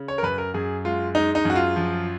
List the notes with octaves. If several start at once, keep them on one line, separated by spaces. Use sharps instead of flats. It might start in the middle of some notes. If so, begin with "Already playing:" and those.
Already playing: C#3
C#5
A#4
F#2 B4
A#4
F#2 G#4
G#3 F4
G#3 D#4
D#4
F#2 F#4
F4
F3